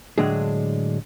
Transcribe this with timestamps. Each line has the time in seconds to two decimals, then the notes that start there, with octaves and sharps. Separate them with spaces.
0.18 A2 D3 F#3 G#3 D4 G#4